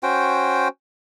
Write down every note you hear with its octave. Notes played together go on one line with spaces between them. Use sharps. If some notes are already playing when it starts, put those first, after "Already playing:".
C#4 F#4 C5 G5